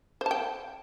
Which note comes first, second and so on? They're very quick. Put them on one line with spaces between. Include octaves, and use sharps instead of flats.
C5 A5 G5